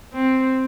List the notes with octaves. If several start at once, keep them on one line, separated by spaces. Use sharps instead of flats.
C4